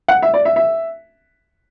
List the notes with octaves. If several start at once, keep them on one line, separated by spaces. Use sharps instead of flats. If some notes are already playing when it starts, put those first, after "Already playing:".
F#5
E5
D5
E5
E5